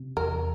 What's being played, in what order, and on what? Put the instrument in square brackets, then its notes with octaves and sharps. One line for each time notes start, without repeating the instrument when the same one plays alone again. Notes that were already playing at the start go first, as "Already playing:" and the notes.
Already playing: [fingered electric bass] C3
[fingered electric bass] E2 [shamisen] A#4